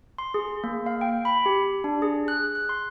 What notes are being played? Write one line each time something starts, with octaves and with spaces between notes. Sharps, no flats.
C6
G#4
A#3
F5
G5
B5
G4
D4
G#4
F#6
F#6
C6